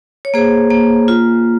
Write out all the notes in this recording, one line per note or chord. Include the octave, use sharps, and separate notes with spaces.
C#5
A#3 G#4 C5
A#3
F4